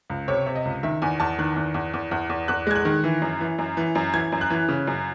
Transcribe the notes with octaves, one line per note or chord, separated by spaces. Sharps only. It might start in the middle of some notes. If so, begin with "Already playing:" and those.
C#2
C3 C#5
C3
D#5
C#2
D#3 E5
E2 G#5
E2 A5
D#3 F#6
E2
E2
E2
E2
E2
E2 F#6
G#3 G#6
F#6
D#3
E3
F#2
E3
F#2
E3
F#2
E3 G#6
F#2
F#6
E3
C#3
F#2